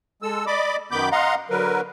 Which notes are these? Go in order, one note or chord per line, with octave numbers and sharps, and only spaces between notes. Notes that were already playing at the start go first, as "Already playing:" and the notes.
G#3 A4 E6
D5 D#5 B5 D6
F#2 D#3 B3 B5 D6 G6
D#5 F5 F#5 A#5 C6
D3 F#3 A#4 B4